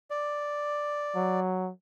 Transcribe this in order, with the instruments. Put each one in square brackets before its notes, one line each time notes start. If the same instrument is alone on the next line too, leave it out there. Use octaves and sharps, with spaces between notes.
[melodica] D5
[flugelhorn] F#3